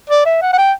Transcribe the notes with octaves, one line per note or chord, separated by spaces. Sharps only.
D5
E5
F#5
F#5
G5